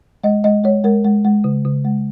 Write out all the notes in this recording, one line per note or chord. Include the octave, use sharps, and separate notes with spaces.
G#3 D#5
G#3 D#5
G#3 C#5
G#3 A#4
G#3
G#3
C#3
C#3
G#3